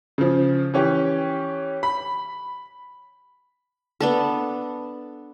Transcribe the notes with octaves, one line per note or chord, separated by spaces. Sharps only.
C#3 F3
E3 C#4 G4
B5
B3 D4 A4